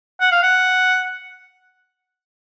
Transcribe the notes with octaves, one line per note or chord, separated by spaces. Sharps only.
F#5
F5
F#5